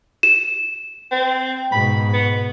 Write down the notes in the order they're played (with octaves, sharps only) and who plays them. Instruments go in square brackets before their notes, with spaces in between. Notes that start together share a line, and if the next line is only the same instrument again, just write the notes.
[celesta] E7
[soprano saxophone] C4
[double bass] G#2 B2 [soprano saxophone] B5
[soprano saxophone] B3